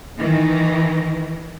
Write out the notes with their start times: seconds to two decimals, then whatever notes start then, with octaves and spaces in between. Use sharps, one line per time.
0.19 D#3 E3